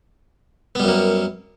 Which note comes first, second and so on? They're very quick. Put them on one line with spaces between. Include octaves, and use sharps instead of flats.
B3 G3 F#2 A#3